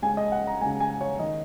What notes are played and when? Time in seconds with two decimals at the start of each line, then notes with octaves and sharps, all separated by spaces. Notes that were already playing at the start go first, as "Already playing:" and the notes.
0.02 C#2 C#3 G#5
0.17 D#5
0.32 F#5
0.47 A#5
0.61 C#2 C#3 G#5
0.80 G#5
1.01 C#5
1.19 D#3 D#5